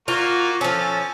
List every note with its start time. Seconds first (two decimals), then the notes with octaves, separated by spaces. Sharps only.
0.08 A#3 F4 F#4
0.61 F3 C#4 A4